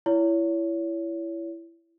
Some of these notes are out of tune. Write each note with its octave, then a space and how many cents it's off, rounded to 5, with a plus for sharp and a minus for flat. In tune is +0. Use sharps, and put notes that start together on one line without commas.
E4 +20 C#5 +30